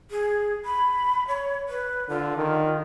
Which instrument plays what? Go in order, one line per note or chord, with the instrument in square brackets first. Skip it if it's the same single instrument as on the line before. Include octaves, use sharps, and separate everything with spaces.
[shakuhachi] G#4
B5
C#5
B4
[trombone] D3 [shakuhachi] F4
[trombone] D#3